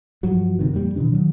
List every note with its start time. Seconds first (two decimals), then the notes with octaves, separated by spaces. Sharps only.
0.23 G2 F3 F#3
0.59 F#1 C3 D#3
0.73 F2 A#2 G3
0.96 B2 D#3 E3 D4
1.12 D#3 F#3